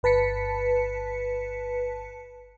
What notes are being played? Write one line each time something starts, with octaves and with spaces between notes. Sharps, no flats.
G1 B4 A5 B6 C#7